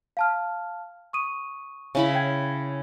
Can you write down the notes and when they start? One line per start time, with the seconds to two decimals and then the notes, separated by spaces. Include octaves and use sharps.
0.17 F5 A5 F6
1.13 C#6 D#6 D#7
1.95 C#3 E4 B5
2.13 C#5 G5 G#6